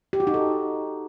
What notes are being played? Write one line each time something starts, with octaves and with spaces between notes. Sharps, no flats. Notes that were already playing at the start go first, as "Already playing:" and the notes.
G4
F#4
D#4
A4